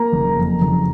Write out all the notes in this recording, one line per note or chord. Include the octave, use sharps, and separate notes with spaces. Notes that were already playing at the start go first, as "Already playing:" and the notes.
Already playing: A#3 A#5
F#1
F2
F#1